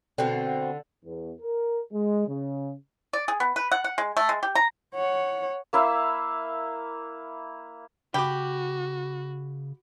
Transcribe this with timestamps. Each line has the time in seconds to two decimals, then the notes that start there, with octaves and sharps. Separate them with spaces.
0.18 B2 D3 C4
1.05 E2
1.41 A#4
1.93 G#3
2.27 C#3
3.13 D5
3.28 G#4
3.40 B3
3.56 B4
3.72 F#5
3.84 F#5
3.98 G#3
4.17 A3
4.29 G#3
4.43 G4
4.55 A#5
4.94 C#5 F#5
5.73 A#3 E4 E5 F5
8.14 C#3 F#4 G4 B5 D6